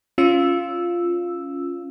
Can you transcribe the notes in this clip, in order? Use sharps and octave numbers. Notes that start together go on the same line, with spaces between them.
C#4 F4 E6